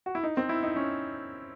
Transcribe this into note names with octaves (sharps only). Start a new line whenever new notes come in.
F#4
E4
D#4
C4
E4
D#4
C#4